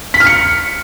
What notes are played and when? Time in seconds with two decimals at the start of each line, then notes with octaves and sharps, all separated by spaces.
0.14 B6
0.20 F6
0.26 C#7